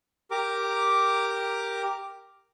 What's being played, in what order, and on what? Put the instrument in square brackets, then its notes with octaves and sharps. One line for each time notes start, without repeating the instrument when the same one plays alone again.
[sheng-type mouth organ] G4 A#4 D6